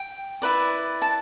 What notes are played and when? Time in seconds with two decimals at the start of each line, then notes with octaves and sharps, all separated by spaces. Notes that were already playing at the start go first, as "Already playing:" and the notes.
Already playing: G5
0.42 E4 B4 D5
1.02 A5